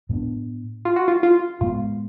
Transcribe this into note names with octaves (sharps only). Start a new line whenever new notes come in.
A2 G#3 B3 D4
F4
F#4
F4
F4
A2 G#3 B3 F4